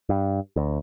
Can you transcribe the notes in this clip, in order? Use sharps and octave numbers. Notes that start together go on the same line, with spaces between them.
G2
D2